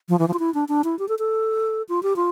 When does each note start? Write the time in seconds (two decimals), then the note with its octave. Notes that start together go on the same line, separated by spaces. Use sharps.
0.09 F3
0.19 E3
0.28 F3
0.33 F4
0.39 E4
0.54 D4
0.68 D4
0.84 E4
0.99 G4
1.09 A4
1.19 A4
1.89 F4
2.03 G4
2.16 F4